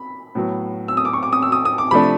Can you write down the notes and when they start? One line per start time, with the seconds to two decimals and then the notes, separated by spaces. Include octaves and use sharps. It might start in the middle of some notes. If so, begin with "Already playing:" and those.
Already playing: B5
0.35 A2 F#3 B3
0.88 E6
0.97 D#6
1.05 D6
1.13 C#6
1.23 D6
1.33 D#6
1.42 E6
1.52 D#6
1.65 D#6
1.78 D6
1.91 C3 F3 A3 D4 B5